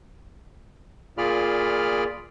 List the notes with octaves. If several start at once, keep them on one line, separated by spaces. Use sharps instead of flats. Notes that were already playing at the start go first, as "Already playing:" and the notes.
A#2 F4 G#4 D5 B5 F6